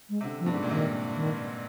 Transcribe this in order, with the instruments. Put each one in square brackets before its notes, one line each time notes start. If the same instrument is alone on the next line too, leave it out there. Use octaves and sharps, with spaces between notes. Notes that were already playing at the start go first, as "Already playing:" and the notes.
[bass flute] G#3
[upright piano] C3
D3
[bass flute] F3
[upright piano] G2
G#2
A#2
[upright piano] C3 [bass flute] D#3
[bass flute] D#3